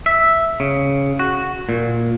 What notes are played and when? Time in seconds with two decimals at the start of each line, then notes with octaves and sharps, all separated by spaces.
0.06 E5
0.60 C#3
1.19 F#4
1.69 A#2